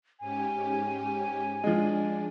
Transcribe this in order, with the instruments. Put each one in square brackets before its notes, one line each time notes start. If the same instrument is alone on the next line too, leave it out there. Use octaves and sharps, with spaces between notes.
[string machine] G#2 C#4 G4 [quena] G#5
[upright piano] F3 G#3 [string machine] D4